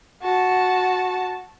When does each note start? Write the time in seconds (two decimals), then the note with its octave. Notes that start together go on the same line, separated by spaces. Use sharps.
0.22 F#4 A5